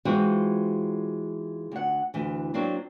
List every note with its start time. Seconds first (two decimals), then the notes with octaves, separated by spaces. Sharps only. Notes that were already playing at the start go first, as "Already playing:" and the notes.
0.05 E3 G#3 C4 D#4 F4 F#4
1.72 D2 F#5
2.14 D2 E3
2.54 F#3 A#3 C4 D4